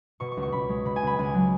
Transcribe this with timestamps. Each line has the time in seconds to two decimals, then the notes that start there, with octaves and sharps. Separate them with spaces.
0.20 B2 C#6
0.31 C#6
0.37 C#2
0.42 C#6
0.52 C#2 B5
0.69 G#3
0.85 B2 B5
0.96 G#5
1.03 C#2 B5
1.19 C#2 G#5
1.34 F#3